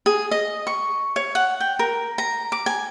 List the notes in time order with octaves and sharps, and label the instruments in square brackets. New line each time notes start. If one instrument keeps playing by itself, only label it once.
[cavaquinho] G#4
D#5
C#6
C#5
F#5
G5
A#4
A#5
D6
G#5